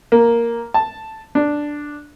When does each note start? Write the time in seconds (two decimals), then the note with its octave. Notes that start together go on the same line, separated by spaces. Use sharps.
0.12 A#3
0.74 A5
1.35 D4